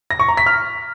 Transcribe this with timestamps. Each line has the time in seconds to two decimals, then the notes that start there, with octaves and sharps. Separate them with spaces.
0.11 A#6
0.19 C#6
0.28 A#5
0.37 B6
0.46 F6